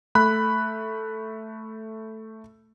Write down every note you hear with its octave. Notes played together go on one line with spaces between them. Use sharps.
A3 B5 F#6